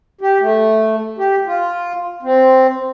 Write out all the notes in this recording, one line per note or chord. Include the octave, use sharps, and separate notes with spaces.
G4
A3
G4
F4
C4